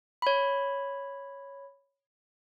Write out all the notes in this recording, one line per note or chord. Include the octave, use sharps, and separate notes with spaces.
C#5 B5